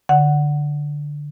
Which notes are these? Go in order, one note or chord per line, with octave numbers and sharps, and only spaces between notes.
D3 F#5